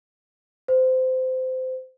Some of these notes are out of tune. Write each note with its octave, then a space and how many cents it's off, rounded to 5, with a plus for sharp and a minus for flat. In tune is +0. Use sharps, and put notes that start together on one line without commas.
C5 -20